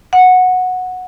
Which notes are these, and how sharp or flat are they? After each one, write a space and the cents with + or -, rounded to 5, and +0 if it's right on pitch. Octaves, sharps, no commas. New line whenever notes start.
F#5 -10